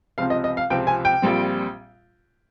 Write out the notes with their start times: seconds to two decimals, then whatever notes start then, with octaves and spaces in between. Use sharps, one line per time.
0.18 C#2 C3 F3 C4 F5
0.30 D#5
0.44 D#5
0.57 F5
0.70 C#2 C3 F3 C4 G5
0.87 G#5
1.05 G5
1.22 A#1 A#2 G3 C4